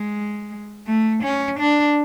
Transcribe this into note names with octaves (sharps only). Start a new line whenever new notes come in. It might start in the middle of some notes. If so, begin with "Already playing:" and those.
Already playing: G#3
A3
C#4
D4